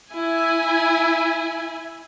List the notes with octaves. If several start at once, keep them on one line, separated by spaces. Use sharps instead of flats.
E4 G#5